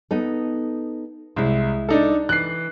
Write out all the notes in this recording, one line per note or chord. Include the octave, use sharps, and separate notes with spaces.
B3 D#4 A4
C2 G#3 E4
D4 D#4 A4
E3 F#6 C7